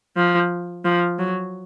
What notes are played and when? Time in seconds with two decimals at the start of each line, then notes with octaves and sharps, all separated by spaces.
0.17 F3
0.85 F3
1.19 F#3